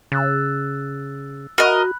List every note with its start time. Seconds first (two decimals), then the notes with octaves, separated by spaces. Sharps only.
0.12 C#3 E6 F#6 A6
1.58 F#4 A#4 D#5 B5 F#6